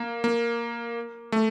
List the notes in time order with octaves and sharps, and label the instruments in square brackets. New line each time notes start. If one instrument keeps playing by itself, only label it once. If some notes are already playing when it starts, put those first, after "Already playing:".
Already playing: [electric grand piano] A#3
A#3
A3